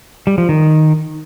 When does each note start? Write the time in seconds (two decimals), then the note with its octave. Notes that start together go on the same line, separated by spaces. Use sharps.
0.27 G3
0.38 F3
0.49 D#3